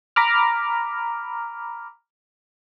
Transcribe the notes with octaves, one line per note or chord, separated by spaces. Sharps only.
A#5 B5 D6 F6